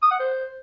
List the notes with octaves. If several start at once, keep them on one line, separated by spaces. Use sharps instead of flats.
D#6
F#5
C5